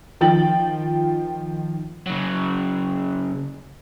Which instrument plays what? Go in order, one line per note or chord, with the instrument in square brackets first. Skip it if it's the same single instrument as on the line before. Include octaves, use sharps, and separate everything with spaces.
[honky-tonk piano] D#3 F3 G5 A6 F#7
[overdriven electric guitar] C#3 F#3